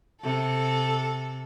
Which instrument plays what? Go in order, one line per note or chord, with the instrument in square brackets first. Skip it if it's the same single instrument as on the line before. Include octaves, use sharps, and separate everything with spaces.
[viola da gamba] C3 A4